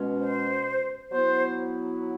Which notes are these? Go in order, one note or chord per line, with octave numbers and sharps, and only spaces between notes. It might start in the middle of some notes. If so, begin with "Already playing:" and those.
Already playing: B2 G#3 C#4
C5
F#3 B3 E4 C5